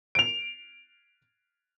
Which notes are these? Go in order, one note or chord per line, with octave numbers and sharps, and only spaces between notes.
D7 F7